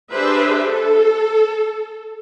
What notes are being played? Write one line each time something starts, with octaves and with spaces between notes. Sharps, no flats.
D4 G4 G#4 B4 C5 E5
A4